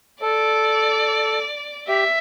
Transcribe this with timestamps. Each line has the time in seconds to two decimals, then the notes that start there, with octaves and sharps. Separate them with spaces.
0.22 A4 D5
1.88 G4 E5